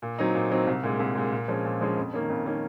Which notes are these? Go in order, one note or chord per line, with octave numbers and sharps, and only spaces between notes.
A#2
F#3 C4 D#4
A#2
F#3 C4 D#4
C2
A#2 G#3
C2
A#2 G#3
A#2
F3 G#3 C#4
A#2
F3 G#3 C#4
F2
D#3 A#3 C#4
F2
D#3 A#3 C#4